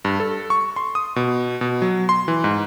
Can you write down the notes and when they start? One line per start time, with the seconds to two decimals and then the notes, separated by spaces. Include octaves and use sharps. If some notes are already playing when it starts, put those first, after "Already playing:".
0.05 G2
0.20 A4
0.50 C#6
0.76 C6
0.95 D#6
1.16 B2
1.61 B2
1.82 F#3
2.09 C6
2.28 E3
2.44 G#2